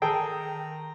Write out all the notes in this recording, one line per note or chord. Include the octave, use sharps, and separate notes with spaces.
D#3 G#4 A4 G5 A#5